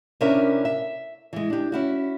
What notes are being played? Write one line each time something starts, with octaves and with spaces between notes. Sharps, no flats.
C3 C#4 D4 E4 A#4 E5
E5
E3 G#3
D4 G4
C#4 E4 F#4